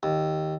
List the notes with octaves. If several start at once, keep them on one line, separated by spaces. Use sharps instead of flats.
D#2